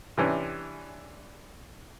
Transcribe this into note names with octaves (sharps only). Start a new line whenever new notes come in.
C3 E3 C#4 D4